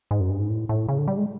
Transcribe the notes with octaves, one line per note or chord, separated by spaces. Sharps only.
G#2
F#2
G2
G#2
A2
A2
C#3
D3
G3
G#3